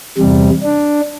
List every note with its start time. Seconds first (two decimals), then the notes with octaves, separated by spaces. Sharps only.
0.18 E2 C3 G3
0.63 D4